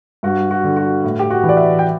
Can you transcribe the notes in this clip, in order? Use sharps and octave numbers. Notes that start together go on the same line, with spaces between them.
G2 F#4
F#4
D3
F#4
A2
G4
F#4
E3
D5
E5
G5